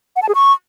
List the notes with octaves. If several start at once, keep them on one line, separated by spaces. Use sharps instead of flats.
F#5
A5
G#4
C#6